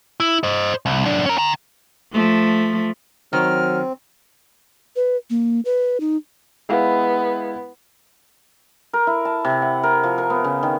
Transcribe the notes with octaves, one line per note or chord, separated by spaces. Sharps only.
E4
C5 D#5
C2
F#2 D4
C#4 A#4
G5 A#5
F3 A3
D#3 F#3 C4 F6
B4
A#3
B4
D#4
G#3 B3 E4 F5
A#4
E4
A5
C3
F#5
A#4
F3
A#4
B3
C#3
D#3